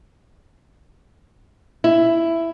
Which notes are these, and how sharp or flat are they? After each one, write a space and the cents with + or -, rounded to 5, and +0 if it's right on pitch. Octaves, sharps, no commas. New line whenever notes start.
E4 +10